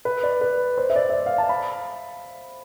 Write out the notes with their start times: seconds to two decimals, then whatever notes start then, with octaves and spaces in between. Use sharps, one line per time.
0.05 B4
0.23 D5
0.41 B4
0.78 C5
0.90 E5
0.96 D5
1.09 E5
1.13 D5
1.26 F5
1.38 A5
1.49 B5